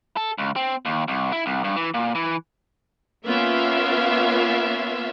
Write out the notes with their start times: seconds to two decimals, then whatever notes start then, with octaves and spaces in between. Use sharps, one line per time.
0.17 A4
0.38 C#2
0.56 C4
0.85 D#2
1.08 C2
1.32 E4
1.46 C2
1.64 G2
1.76 E3
1.94 A#2
2.15 E3
3.26 A#3 B3 C#4 F4 E5 F5